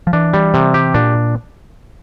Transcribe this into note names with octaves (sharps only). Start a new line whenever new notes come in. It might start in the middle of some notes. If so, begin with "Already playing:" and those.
F3
E3 D4
G3
C3
G4
A#2 D4